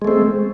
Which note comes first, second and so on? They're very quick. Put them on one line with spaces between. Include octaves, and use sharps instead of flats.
G#3 A3 C4